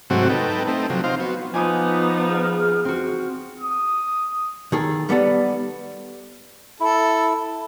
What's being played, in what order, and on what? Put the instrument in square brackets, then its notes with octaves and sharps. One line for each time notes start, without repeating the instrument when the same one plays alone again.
[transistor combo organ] G#2 C3 F#3 A3 C4 F#4
D#4 A4 B4 G5
A3 C4 D#4
C3 F3 F#3
C4 D#4 F4 C5 F5
B3 F#4
[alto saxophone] F3 [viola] B3 D#4 [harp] G#5 D6 D#6
[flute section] G#4 F6
[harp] C4 F#4
[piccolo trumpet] D#6
[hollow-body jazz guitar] D#3 G#4 A4
G3 B3 A4 D5
[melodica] E4 [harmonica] A4